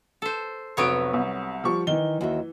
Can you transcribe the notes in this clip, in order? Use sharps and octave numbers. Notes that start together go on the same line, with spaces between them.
A4 C5
F1 F#3 B3 F#4 C#5 D7
C2
F3 G3 C#6
D#3 E3 G7
D#2 F#4 E5